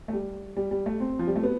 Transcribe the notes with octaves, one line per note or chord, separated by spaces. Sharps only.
A3
G3
G3
G3
A3
C4
F3
G3
A3
B3